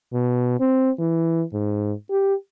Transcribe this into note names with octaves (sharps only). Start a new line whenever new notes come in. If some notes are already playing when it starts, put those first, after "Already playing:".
B2
C4
E3
G#2
G4